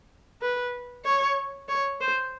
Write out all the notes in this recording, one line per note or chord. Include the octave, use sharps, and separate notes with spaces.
B4
C#5
C#5
C5